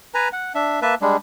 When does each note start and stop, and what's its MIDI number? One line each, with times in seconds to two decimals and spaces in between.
0.14 0.28 71
0.14 0.28 80
0.14 0.28 82
0.33 0.53 78
0.55 0.80 62
0.55 0.80 76
0.82 0.95 58
0.82 0.95 71
0.82 0.95 76
0.82 0.95 81
1.02 1.17 55
1.02 1.17 56
1.02 1.17 62